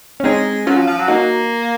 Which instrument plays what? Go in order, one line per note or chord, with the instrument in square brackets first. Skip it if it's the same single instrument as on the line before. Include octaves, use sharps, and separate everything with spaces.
[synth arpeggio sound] C#4
[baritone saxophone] G#3 [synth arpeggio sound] C4 D#4
[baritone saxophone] F#3 [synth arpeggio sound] C#4 F4
[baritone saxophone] F3
F3
F#3
[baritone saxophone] A#3 [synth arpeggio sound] D#4 F#4